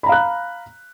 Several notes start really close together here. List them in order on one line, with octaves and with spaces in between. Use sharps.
B5 A#5 F5 F#6